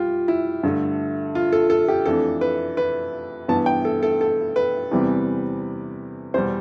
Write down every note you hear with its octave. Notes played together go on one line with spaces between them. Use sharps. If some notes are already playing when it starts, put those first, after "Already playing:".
Already playing: G3 F4 G4
E4
G2 D3 A3
F4
A4
A4
G4
F2 E3 A3 D4 A4
B4
B4
G2 E3 B3 A5
G5
A4
A4
A4
B4
E2 C3 E3 G3 C4
E2 B2 G3 C5